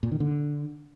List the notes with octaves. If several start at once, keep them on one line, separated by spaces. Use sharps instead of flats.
A#2
D#3
D3